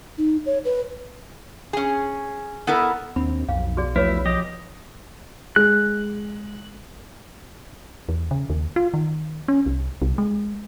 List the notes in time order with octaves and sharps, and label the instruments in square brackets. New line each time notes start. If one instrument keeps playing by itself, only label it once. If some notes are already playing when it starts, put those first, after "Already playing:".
[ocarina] D#4
C#5
B4
[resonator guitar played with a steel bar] C#4 G#4
B3 E4 A4 A#4
[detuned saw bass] D#2 [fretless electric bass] C4 D4 [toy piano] B5
[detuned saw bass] B1 [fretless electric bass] F2 [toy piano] F5
[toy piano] F#4 G#4 D5
[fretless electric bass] E2 F3 A3 [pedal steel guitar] E4 [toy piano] B4 C#5
[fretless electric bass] F3 [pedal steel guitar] G4 D#5
[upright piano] G#3 [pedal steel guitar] F#6
[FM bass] E2
C#3
D#2
F4
D#3
C#4
C2
C2
G#3